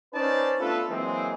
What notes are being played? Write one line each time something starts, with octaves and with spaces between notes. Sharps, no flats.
C#4 D#4 B4 C5 D5 A5
A3 B3 D4 F4 A4 B4
E3 F#3 G#3 A#3 C4 G#4